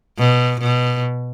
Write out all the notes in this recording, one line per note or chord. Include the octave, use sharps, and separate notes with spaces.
B2
B2